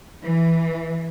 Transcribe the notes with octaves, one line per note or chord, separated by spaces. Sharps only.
E3